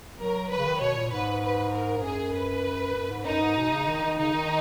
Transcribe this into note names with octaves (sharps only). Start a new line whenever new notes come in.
F#3 A#4
F#3 B4
C#3
D#3
B2 C#5
A#2
G#2 B4
B4
A#4
G#2
F#2 G#4
B4
F#2
G#2
F#2 D#4
G#2
B2
C#3
D#3
D#3
C#3 D#4
D#3